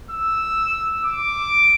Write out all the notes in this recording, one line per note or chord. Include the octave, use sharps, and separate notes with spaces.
E6
D6